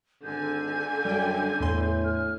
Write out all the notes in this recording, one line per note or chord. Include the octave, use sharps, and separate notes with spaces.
G#1 D3 G#5 G6
F#2 G3 G5
E2 A2 C6
F6